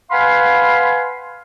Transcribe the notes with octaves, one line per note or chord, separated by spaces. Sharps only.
B4 F5 F#5 G#5 B5 C6